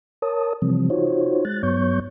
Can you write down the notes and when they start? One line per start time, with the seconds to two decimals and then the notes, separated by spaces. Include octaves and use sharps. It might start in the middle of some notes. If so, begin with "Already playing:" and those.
0.22 A#4 C#5 A5 D#6
0.62 C3 E3 F3 G3 C4
0.90 D#4 F4 F#4 C5 C#5
1.45 G#3 F#6 A6
1.63 G2 F#3 B3 C#5 C#6 G6